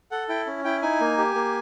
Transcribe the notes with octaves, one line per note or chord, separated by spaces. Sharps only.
A4 F#5
E4 G5
C#4
E4 G5
D#4 G#5
A#3
G4
A#3